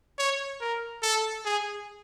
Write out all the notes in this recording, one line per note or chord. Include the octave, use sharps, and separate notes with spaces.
C#5
A#4
A4
G#4